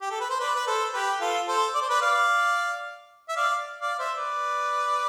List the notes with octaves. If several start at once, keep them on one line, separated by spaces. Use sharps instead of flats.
G4
A4
B4
C5
B4 D5
B4
A4 C5
G4 B4
F4 A4
A4 C5
D5
C5
B4 D5
D5 F5
E5
D5 F5
D5 F5
C5 E5
B4 D5